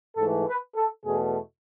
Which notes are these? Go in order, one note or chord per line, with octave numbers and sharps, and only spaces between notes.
G#2 E3 A3 A4
B4
A4
E2 B2 A3 G#4